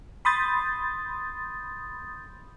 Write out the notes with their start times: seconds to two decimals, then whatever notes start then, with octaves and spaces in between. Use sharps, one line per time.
0.25 B5 C6 D#6 G6 A6